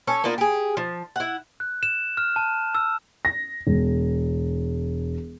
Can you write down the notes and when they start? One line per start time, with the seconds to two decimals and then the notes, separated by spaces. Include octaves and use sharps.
0.07 C#4 A4 C#5
0.24 A#3 B3 D4 F4
0.38 G4 G#4
0.77 F3
1.16 E4 F#5
1.60 F#6
1.83 E7
2.17 F6
2.36 A5
2.75 E6
3.25 A#6
3.67 E1